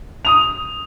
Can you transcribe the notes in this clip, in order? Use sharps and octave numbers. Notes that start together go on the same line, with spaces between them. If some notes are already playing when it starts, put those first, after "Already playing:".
D#6 F7